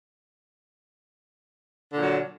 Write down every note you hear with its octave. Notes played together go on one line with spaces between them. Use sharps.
A#2 D3 F#3